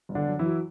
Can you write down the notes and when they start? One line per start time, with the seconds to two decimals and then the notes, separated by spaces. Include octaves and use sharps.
0.09 G1
0.15 D3 D4
0.27 F#2
0.39 E3 E4
0.45 F#3